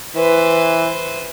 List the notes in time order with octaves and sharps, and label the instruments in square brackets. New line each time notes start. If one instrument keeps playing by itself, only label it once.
[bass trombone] E3 [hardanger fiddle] B4 C5